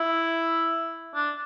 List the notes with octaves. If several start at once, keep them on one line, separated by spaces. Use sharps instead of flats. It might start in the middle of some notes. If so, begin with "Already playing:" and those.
Already playing: E4
D4